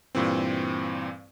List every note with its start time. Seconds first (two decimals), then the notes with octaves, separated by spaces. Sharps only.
0.15 G2 A#2 E3 C4